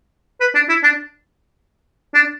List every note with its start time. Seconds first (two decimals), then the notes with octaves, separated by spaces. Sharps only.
0.41 B4
0.55 D4
0.69 E4
0.84 D4
2.15 D4